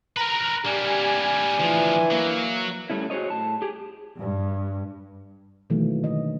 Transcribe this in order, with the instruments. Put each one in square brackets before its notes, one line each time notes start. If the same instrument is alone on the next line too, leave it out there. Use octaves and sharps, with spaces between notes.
[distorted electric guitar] A#4 B4 [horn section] A#5
[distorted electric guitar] G3 A#3 [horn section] D4 G#5 [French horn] G4
[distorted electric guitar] D2 F3 [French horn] E3
[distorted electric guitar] F#3 [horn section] A#3
[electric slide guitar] G3 A3 C#4 E4
F#4 G#4 C5 C#5 D#5
A2 A5
G4 G#4
[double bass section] G2
[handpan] B2 D#3 E3 F#3 A3 A#3
D3 D#3 D#5